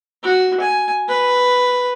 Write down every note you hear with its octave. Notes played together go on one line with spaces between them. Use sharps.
F#4
G#5
B4